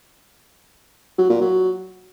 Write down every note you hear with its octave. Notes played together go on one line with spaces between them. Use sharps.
F#3
A#2
F#3